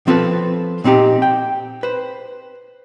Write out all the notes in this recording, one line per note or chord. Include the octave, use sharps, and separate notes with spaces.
F3 C4 F4 A4 B4
A#2 C4 D#4 G4
G5
B4 C5